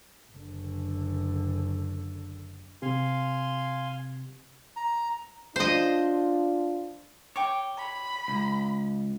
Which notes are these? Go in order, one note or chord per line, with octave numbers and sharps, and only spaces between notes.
F#1 D3
C3 C4 G4 F5 G#5 C6
A#5
D4 F4 C5 D#5
C#5 G5 C#6 D6
B5
C#2